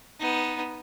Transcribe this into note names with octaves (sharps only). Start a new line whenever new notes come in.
B3 D#4